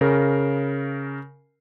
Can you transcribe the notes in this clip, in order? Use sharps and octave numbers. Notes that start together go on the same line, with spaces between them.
C#3 A#4